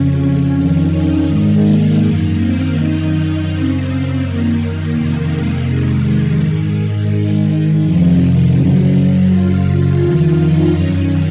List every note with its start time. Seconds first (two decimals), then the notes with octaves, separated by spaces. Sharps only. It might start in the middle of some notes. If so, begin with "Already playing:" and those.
Already playing: F2 C#3 C#4
0.56 F2 D#3 C#4
0.92 D#4
1.29 G#2 D#3 G#3
1.65 A#3
2.01 F#2 D#3
2.38 C4
2.73 F#2 D#3 D#4
3.46 F#2 C#3 C4
4.18 F#2 D#3 A#3
4.91 F2 C3 D#3
5.28 G#3
5.64 F2 C3 D#3
6.00 G#3
6.36 G#2 D#3
6.73 G#3
7.09 G#2 D#3
7.81 F2 C3 D#3 F3
8.54 F#2 C#3 F#3
9.26 F#2 C#3 F4
9.99 F2 D#3
10.35 D#4
10.71 F#2 D#3 C#4